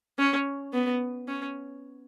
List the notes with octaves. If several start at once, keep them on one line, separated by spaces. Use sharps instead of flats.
C#4
B3
C#4